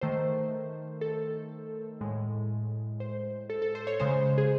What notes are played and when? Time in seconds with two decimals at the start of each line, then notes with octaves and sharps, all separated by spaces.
0.01 D#3 A3 C5
1.01 A4
2.01 A2 G#3
3.00 C5
3.50 A4
3.62 A4
3.75 C5
3.87 C#5
4.00 C#3 G#3 C5
4.38 G#4